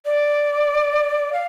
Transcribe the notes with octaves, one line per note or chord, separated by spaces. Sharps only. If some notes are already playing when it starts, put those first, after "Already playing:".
D5
F5